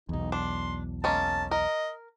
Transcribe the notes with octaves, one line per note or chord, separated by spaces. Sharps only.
B1 E2 D#4
D4 C6
G#3 A#3 C#4 A5
A#4 D#5